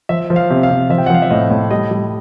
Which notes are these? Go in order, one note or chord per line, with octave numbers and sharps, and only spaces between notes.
F3 E5
F3
F5
C3
F5
C3
F3 E5
G5
F#5
F3 F5
E5
A2 D#5
A2
G3 D#5
G3